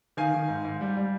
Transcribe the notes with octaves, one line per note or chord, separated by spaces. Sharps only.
D#3 F5 G#5
D#3
G#2
G#2
G3
G3